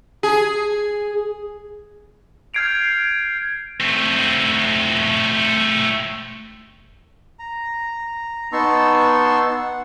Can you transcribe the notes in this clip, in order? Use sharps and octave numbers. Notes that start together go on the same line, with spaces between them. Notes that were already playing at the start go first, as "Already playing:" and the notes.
G#4
F6 G6 G#6 C7 D7 F7
A3 C4
A#5
B3 D#4 A5 C6 C#6 E6
F#5